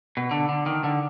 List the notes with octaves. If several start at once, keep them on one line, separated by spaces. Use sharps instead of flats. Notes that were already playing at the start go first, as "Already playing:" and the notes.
B2
D3
D3
D#3
D3